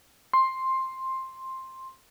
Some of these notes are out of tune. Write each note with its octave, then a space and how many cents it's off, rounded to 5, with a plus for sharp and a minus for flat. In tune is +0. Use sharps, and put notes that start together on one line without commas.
C6 +10